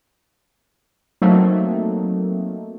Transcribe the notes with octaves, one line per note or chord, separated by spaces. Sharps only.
F#3 A3 A#3 C4 D#4